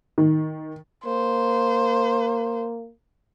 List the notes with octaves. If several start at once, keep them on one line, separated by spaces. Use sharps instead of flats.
D#3
A#3 C5